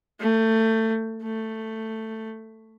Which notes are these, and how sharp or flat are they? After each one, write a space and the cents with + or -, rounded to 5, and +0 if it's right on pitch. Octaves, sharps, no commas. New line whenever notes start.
A3 +25
A3 +10